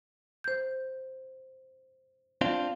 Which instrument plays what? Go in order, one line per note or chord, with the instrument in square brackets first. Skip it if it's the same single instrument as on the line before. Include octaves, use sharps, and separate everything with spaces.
[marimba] C5 G6
[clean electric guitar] C4 D4 F4